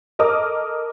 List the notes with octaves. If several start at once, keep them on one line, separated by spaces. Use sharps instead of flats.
A4 A#4 D#5 D6 D#6 F6